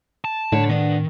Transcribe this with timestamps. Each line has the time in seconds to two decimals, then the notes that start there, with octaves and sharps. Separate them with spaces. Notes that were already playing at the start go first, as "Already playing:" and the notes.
0.25 A5
0.52 A2 D3 G3 C#5
0.69 D#3 B3 D4